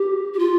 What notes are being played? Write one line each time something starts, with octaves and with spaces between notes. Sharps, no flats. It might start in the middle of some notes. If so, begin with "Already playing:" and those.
Already playing: G4
G4
F4